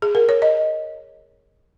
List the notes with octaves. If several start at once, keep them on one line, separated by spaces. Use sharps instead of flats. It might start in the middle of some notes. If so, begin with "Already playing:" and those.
G#4
A#4
C#5
D#5